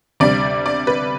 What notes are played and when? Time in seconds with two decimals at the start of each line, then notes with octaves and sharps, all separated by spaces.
0.20 D2 C3 G3 D5
0.66 D5
0.87 B4